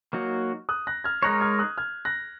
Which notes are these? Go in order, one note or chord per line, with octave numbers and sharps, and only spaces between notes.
F#3 A#3 D#4 F#4
D#6 F#6
F#6 A#6
F6 G#6
G#3 D#4 A#4 C#5 F#6 A#6
F6 G#6
D#6 F#6
F6 G#6
F#6 A#6